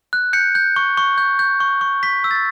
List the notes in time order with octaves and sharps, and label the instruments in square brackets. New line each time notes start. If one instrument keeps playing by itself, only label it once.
[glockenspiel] F#6
G6 C#7
G6
C#6
C#6
G6
G6
C#6
C#6
C#6 B6
E6
A6